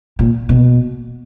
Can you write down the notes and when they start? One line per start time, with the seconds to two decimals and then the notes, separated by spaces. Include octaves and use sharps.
0.19 A#2
0.49 B2